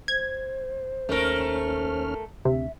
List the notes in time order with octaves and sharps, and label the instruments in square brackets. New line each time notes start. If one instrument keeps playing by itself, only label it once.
[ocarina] C5 [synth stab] G#6
[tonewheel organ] D#2 C#4 F6 [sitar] A3 A#4
[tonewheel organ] D2 [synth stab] C3 [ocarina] E5